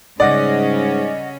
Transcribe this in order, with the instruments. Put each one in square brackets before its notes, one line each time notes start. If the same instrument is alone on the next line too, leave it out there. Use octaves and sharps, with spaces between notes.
[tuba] G#2 [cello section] C#3 G3 C#4 [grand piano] D5 [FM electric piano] D#5 F#5 A#6